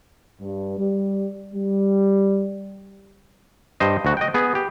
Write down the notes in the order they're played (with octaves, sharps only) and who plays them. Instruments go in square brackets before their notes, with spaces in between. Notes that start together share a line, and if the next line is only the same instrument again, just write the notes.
[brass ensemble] G2
G3
G3
[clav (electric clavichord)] G2 C5 D#5
D2 F#4
D#5 G5
B3 G#4
G4